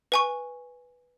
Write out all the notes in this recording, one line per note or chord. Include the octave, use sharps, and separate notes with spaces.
B4 G#5 C#6